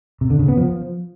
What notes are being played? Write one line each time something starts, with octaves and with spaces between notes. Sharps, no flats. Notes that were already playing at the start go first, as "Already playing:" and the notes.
C3
D3
C#3
B3
F3